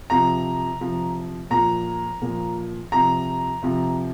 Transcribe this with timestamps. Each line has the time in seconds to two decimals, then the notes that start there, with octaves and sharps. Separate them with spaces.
0.10 C3 F3 A#5
0.81 C3 F3
1.51 A#2 F3 A#5
2.22 A#2 F3
2.92 C3 F3 A#5
3.63 C3 F3